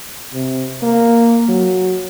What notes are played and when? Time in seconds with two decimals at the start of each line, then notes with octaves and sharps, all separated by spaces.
0.34 C3
0.83 A#3
1.49 F#3